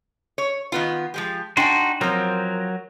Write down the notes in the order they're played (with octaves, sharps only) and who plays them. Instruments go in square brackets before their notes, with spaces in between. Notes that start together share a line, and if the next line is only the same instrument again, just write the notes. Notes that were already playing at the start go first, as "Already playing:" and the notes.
[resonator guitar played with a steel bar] C#5
D#3 B3 F4
F3 G#3 G4
[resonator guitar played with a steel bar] D4 G5 G#5 [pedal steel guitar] D#4 F#4 C6
[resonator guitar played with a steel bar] F3 C4 [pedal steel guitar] F#3 A#4